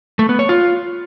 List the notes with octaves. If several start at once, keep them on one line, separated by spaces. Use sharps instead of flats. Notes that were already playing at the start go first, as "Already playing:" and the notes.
A3
B3
C#5
F4